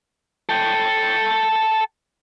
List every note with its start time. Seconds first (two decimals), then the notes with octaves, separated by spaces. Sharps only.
0.49 A4 G5